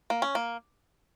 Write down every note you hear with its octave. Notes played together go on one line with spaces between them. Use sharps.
A#3
C#4
A#3